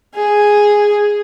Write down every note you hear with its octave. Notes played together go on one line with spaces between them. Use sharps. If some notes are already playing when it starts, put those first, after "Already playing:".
G#4